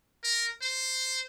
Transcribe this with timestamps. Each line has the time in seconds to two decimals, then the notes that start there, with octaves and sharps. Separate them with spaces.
0.24 A#4
0.62 C5